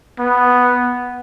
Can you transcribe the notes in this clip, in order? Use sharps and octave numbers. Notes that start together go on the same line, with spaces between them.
B3